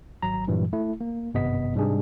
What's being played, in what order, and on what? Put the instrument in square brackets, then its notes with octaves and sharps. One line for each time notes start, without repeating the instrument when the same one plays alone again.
[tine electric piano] G#1 F#3 A#5
G2 A#2 E3 F#3 G3
A3 E4
A#3
G#1 G2 C3 B3 D#5 B6
G#2 C3 G3 G#3 D4 G#4